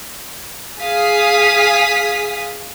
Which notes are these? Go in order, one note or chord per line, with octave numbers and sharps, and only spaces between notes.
G#4 F5 D#6 B6